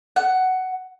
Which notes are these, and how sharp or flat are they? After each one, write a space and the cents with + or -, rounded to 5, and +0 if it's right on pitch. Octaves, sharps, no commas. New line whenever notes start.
F#5 +10